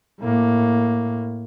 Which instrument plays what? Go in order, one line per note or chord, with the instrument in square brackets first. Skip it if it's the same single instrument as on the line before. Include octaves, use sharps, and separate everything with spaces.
[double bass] A2 A#3